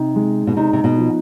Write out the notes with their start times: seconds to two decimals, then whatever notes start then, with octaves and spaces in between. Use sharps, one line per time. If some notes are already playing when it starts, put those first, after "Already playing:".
Already playing: C3 D#4
0.16 G#3
0.47 B2
0.57 C3 D#4
0.73 C3
0.84 B2
0.97 F3